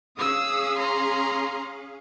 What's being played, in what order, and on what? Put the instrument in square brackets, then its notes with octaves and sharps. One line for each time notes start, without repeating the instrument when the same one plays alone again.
[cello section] C#4 G#4 F5 [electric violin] D#6 E6
[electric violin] A#5 C6